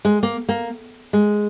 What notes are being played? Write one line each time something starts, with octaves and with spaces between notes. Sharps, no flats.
G#3
A#3
A#3
G#3